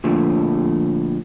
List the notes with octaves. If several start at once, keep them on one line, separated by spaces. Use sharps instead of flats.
A#2 D3 F3 A3